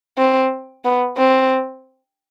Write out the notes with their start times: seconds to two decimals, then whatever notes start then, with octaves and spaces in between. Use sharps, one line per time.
0.18 C4
0.85 B3
1.17 C4